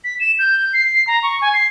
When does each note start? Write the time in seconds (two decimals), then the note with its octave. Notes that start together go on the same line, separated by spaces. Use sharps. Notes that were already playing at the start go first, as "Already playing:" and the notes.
0.04 B6
0.20 E7
0.39 G6
0.73 C7
1.07 A#5
1.23 C#6
1.41 G#5
1.54 C7